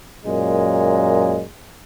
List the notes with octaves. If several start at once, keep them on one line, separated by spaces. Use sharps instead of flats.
F#2 A#2 G#3